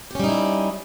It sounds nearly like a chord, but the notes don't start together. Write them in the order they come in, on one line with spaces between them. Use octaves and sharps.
G4 C#4 G3 D#4 E4